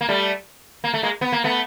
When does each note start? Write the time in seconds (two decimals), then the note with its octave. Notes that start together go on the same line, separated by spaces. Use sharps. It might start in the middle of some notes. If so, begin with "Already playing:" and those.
0.01 A#3
0.08 G3 A3
0.84 A#3
0.94 A3
1.03 G#3 A#3
1.21 B3
1.32 A#3
1.44 A3 B3